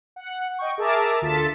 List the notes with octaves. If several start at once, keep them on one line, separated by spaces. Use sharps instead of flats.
F#5
D#5 G5 C#6
G#4 A#4 E5 A5 A#5 D6
D2 F4 A4 A6 B6 E7